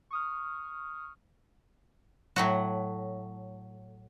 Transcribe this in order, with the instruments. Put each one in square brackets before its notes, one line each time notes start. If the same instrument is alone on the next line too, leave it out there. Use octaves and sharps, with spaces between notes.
[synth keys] C#6 D#6 F6
[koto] A2 F#3 F#4